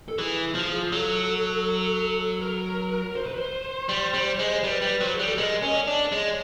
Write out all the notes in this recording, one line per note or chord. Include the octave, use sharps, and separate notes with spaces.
A4
E3 G#4
F3
F#3 A4
A#4
C5
B4
C5
G3
G3
G#3
C5
G3 B4
G3
F#3 C5
G#4
G3
A4
G#3 A#4
C#4 D#5
D5
D4
D5
G#3 C#5